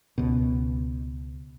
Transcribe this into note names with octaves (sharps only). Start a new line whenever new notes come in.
C#2 B2